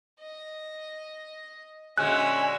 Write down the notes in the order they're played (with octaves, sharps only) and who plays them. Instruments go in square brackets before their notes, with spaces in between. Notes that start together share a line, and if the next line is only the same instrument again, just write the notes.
[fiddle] D#5
[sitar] A#2 D3 G#3 [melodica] C#4 G#5 [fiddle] F#4 E5 [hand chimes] F#6